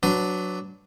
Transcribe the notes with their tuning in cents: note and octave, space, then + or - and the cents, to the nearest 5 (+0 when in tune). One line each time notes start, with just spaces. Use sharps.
F#3 +0 D4 +0 B4 +20